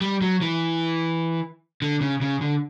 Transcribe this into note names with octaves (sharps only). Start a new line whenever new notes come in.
G3
F#3
E3
D3
C#3
C#3
D3